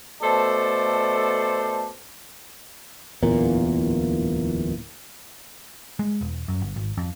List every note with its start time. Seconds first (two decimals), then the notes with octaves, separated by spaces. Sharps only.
0.21 B2 A3 A4 C5 D5 A5
3.22 D1 E2 A#2 A#3
5.99 G#3
6.21 E1
6.48 F#2
6.61 G1
6.76 G#1
6.97 F2